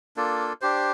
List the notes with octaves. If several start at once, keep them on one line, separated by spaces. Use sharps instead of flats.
A#3 D4 F4 A4
D4 G4 C5